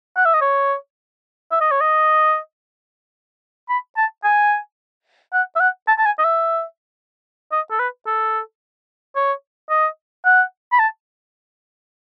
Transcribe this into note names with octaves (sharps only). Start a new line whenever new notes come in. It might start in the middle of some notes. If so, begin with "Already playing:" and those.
F#5
E5
D#5
C#5
E5
D#5
C#5
D#5
B5
A5
G#5
F#5
E5
F#5
A5
A5
G#5
D#5
E5
D#5
A4
B4
A4
C#5
D#5
F#5
B5
A5